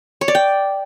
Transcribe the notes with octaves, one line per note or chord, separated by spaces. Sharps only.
C#5
D5
G5